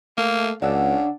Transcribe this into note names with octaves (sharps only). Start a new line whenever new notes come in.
A3 A#3 F5
C#2 C#3 D4 F#4 E6